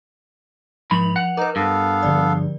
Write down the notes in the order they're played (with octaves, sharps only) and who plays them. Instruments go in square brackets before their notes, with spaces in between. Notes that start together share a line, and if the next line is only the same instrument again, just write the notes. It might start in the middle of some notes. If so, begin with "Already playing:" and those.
[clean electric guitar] G#2 B5 [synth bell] F3 F7 F#7
[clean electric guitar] F#5
[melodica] D#4 D6 [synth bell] A#4 B4
[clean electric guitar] G2 [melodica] B3 A4 F5
[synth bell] D3 F3 D5